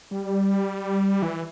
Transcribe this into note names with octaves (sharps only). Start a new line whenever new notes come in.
G3
E3